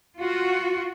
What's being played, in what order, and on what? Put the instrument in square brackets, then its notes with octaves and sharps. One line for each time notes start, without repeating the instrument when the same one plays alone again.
[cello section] F4 F#4